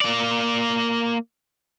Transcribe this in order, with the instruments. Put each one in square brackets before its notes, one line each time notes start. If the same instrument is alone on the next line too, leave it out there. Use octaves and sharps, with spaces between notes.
[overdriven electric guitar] A#3 D5